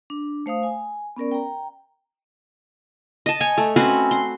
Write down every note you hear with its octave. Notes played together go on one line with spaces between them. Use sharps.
D4
A3 C5 F5 D#6
G#5
B3 C#4 A#4 D5
G5 A#5
D#5 A5
C#5 G#5
A3
C4 C#4 F#4 B4
C6